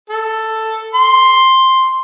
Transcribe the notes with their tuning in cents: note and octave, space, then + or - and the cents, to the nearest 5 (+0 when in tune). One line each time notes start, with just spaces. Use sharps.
A4 +5
C6 +5